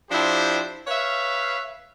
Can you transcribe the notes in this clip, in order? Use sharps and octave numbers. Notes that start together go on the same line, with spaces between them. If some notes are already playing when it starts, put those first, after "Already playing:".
F3 D4 E4 G4 C5
B4 C#5 E5 F5